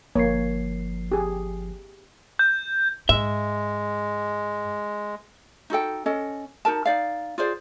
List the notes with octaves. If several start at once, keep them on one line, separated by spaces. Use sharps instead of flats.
G1 F3 A#3 C#5 C7
G4 G#4
G6
G#2 G#3 E5
D#4 F#4 A4 G5
C#4 A4 D#5
D#4 F#4 A#4 A5
D#4 D5 F5
F4 G#4 C5 D5